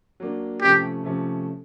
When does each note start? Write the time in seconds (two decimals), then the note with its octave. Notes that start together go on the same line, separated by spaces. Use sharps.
0.20 F#3 A#3 D4
0.62 C3 F3 A3 C#4 G4
1.03 C3 F3 A3 C#4